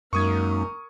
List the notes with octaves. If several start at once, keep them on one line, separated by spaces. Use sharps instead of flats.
F#2 G#3 A#3 D#4 A#4 C#6 D#6 G#6